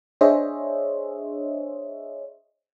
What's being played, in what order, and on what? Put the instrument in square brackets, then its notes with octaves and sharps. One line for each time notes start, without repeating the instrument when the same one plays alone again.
[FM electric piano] D4 G#4 C5 C#5 D#5 E5